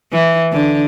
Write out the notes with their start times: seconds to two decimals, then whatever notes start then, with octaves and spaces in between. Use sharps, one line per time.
0.12 E3
0.52 D3